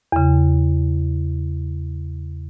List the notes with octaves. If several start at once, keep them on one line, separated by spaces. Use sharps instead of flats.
E2 C#3